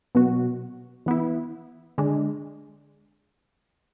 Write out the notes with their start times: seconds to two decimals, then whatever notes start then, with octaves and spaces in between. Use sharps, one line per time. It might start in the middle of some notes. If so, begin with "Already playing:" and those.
0.15 B2 F#3 B3 F#4
1.06 E3 B3 E4
1.98 D3 G#3 D4